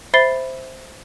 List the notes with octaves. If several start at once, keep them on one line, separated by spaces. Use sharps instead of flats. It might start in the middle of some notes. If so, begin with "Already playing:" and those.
C5 E5 B5 A6 C7 G7